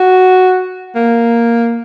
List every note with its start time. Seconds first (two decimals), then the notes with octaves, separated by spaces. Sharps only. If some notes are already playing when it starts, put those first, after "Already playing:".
Already playing: F#4
0.95 A#3